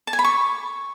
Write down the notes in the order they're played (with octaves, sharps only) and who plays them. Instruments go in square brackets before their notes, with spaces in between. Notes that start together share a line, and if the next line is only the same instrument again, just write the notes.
[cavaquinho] A5
G#5
B5
C#6